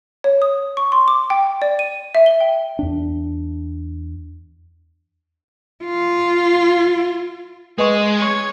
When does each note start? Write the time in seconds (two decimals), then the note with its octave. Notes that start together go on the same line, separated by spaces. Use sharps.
0.24 C#5
0.42 D#6
0.77 C#6
0.92 C6
1.08 D6
1.30 G5
1.62 D5
1.79 D#7
2.15 E5
2.26 G7
2.41 G5
2.79 E2 D4
5.84 F4
7.78 G#3 B4 D#5 C#6 D#6
8.17 C#5 G#6